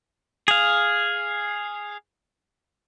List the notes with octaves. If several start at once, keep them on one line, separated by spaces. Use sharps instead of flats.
G#4 F5